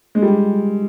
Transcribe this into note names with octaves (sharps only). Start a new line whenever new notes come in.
G#3
G3